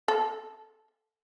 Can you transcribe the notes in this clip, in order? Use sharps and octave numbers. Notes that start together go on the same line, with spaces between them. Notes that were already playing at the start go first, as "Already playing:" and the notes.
A4